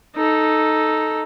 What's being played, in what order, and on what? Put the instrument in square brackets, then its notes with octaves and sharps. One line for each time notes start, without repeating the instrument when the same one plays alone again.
[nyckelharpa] D#4 A4